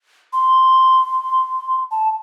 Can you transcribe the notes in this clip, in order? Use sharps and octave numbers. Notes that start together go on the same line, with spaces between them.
C6
A5